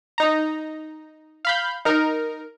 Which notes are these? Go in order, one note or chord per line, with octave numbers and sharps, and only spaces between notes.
D#4 A#5
F5 B5 G6
D#4 A#4